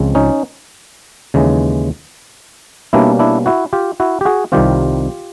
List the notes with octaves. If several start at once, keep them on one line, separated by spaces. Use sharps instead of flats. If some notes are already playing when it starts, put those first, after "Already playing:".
Already playing: C#2 C#3 F3 G#3 C4
C#4 D#4
D#2 C#3 E3 G#3
B2 G3 A#3 C#4 D4 E4
D4 E4
E4 F#4
F4 G4
E4 F#4
G4
F#4 G#4
C2 C3 D#3 G3 C4 F4 G4